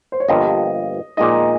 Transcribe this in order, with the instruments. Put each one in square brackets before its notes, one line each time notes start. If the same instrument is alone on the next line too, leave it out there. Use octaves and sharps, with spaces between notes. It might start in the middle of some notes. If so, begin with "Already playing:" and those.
[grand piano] C5
C#5
[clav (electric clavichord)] G1 G2 F3 A#3 F4 [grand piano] D#5
[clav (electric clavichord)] A#1 A#2 G#3 D#4 [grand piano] D#5